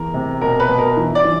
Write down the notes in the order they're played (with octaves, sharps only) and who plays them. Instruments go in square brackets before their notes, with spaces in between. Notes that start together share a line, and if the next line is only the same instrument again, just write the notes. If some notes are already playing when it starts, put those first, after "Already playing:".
Already playing: [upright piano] E2 A#4
C3
B2 A#4
B4
B2
A#4
E3
D5
E3